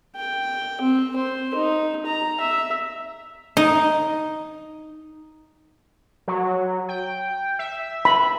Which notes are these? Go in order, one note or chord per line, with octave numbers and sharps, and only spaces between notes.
G5
C4
C5
D#4
A#5
E5
D#4
F#3
G5
E5
B5